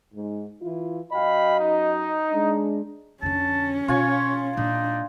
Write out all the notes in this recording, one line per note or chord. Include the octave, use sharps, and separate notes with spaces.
G#2
E3 E4 F4
F#2 F#4 D#5 F5 G5 B5
D#4
G#3 D4
F2 D3 C#4 A5
B2 F4 C#5 G#5
A#2 G#3 D4 D#4